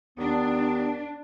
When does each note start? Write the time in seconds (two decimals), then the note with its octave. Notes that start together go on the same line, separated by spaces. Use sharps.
0.18 D#2 B3 D4